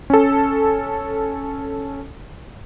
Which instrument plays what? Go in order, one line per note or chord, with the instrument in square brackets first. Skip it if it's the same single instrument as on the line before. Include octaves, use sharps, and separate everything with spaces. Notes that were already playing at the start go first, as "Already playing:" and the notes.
[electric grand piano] C#4 A4